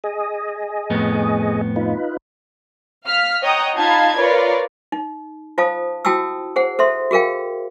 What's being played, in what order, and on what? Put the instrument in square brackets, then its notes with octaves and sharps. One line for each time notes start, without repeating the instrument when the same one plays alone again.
[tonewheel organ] G#4 D#5
[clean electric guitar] F2 A2 B3
[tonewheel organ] D#4 F4 B4
[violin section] F5 F6 B6
C#5 D#5 F#5 G5 A#5 D#6
D#4 F4 F5 A5 B5 G#6
F4 A#4 B4 C#5 D5
[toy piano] D#4
F4 C5 F5 A5 D#6
E4 F#4 G5 A5 D#6 E6
G#4 C5 F#5
A4 C5 E5 C6
F#4 G#4 A#4 F5 G5